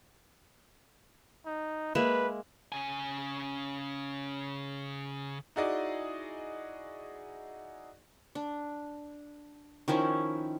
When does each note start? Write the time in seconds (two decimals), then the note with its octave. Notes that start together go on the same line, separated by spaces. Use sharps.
1.46 D#4
1.95 G#3 A#3 B4 E5
2.72 C#3 G#5
5.56 D#4 E4 F#4 G#4 D5 D#5
8.35 D4
9.88 D#3 F3 C#4 E4